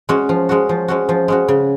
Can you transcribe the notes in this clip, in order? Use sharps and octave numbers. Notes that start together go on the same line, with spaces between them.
G#3 C#4 F#4
F3
G#3 C#4 F#4
F3
G#3 C#4 F#4
F3
G#3 C#4 F#4
C#3